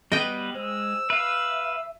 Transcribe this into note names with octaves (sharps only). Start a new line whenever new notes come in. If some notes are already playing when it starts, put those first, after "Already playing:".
G3 B3 B4 D#5 G5
G#3 C5 E6
B4 E5 F5